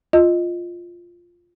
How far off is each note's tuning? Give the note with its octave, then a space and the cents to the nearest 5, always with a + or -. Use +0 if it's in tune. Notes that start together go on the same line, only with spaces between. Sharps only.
F4 +0 D#5 +0